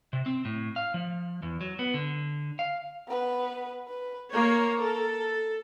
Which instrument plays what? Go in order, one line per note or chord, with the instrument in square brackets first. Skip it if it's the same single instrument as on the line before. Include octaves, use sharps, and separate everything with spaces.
[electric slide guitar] C3
C4
A2
F5
F3
E2
F#3
B3
D3
F5
[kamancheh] B3 B4
B4
[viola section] A#3 C#5 [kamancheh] A#4
[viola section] A4